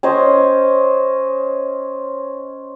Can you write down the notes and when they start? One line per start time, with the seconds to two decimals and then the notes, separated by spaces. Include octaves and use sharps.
0.03 C#4 C5 D#5